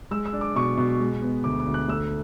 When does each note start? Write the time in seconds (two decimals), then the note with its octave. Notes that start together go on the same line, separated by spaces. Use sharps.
0.11 G#3 E6
0.26 E6
0.33 D4
0.41 D6
0.55 B2 C#6
0.77 B2
1.00 G#3
1.22 B3
1.44 D2 D6
1.60 D6
1.67 D2
1.74 F#6
1.88 A3 E6